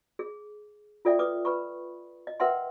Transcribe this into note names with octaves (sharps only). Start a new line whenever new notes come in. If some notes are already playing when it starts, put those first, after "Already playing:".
G#4
F4 A4 D5 E5 G5
B4 D6 D#6
B4 B5 C#6
D#5
A#4 B4 E5 F#5 G5 C6